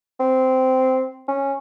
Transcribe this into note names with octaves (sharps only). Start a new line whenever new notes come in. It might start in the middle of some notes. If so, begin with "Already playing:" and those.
C4
C#4